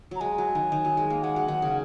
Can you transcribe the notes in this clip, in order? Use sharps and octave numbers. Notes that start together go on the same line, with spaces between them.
F#3 A#5
G#3 G#5
F#3
D#3
D#3
F#3
G#3
A#3
G#3 F#5
F#3
D#3
C#3